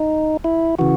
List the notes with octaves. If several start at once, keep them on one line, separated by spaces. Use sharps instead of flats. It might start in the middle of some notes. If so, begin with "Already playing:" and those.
Already playing: D#4
E4
C#3 E3 F#4